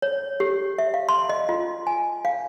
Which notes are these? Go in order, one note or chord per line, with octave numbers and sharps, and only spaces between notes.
C#5
G4
E5
F5
C6
D#5
F4
G#5
F5